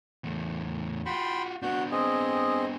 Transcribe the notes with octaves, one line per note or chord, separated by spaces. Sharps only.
E2 A3
F4 F#4 G5 B5 C6
B3 D4 F#4 G6
C4 G#4 D#5